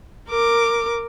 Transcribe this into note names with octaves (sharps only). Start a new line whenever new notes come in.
A#4 D6